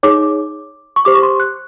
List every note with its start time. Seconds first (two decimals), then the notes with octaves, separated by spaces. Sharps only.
0.03 D#4 G#4 C#5 D6
0.96 C#6
1.05 G4 C5 D6
1.14 C#6
1.23 C6
1.40 F#6